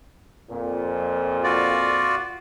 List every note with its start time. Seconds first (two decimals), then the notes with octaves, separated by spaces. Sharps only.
0.50 F2 A#2
1.44 F4 F#4 D5